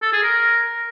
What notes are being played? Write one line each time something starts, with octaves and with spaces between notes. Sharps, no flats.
A4
G#4
A#4